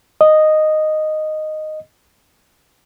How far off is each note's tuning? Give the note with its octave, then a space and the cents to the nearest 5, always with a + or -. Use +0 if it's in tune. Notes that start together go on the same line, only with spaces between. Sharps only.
D#5 -5